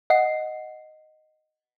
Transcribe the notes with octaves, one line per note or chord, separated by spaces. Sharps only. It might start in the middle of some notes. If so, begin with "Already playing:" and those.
D#5 F#5 C7